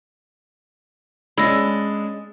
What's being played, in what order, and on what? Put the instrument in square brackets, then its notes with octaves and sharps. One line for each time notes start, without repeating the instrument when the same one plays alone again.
[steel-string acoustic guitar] G#3 D4 [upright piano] C#4 [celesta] B5 E6 A#6